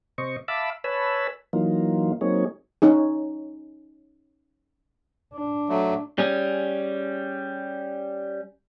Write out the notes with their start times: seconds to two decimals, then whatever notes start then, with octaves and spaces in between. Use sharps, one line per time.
0.18 C3 C5 D#5 C#6
0.48 E5 F5 A5 B5 D6 E6
0.84 B4 C#5 G#5 A5 B5 E6
1.53 E3 F#3 A#3 D#4 F4
2.21 F#3 A#3 C4 D#4 G#4 C#5
2.82 C#4 D#4 G#4
5.34 D4
5.69 F#3 A3
6.18 G3 C#4 G#4